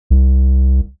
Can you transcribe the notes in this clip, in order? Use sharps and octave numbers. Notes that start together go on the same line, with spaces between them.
C2